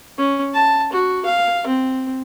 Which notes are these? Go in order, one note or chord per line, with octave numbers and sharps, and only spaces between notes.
C#4
A5
F#4
F5
C4